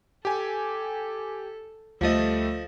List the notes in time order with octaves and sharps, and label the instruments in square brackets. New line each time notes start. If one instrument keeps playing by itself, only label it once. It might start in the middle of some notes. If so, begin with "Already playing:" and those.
[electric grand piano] G4 G#5 [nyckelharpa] A4
[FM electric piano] D2 A6 [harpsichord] F3 D#5 [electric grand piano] G3 A3 [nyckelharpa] A4